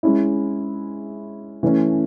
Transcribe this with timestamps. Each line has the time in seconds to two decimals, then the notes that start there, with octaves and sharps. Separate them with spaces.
0.03 G#3 C#4 E4
1.63 E3 A3 C#4